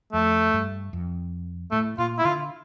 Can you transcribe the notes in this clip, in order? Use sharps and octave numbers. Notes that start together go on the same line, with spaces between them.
F2 A3
G2
F2
A2 A3
A#2 F4
E4
D3 F4